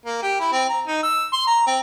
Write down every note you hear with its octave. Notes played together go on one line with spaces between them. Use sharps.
A#3
G4
E4
C4
A#5
D#4
E6
C6
A#5
C4